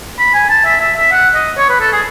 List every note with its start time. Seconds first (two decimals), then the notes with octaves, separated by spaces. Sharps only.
0.19 B5
0.34 G#5
0.49 A5
0.65 E5
0.80 E5
0.96 E5
1.12 F#5
1.35 D#5
1.58 C#5
1.69 B4
1.80 A4
1.92 G#4